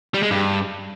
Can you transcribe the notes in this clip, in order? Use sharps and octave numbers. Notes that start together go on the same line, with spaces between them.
G3
G#3
G2